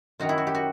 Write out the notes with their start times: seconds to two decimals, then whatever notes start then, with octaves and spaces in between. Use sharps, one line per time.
0.20 F#2 D#3 F#3 F#4
0.29 E4
0.38 F#4
0.47 G4
0.55 F#4